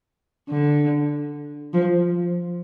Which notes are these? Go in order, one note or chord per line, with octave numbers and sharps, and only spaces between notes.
D3
F3